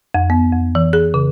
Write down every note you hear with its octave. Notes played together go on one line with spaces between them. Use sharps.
F2
B3
F2
E3
G#4
C#3